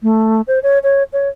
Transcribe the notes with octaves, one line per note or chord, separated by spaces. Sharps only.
A3
C5
C#5
C#5
C#5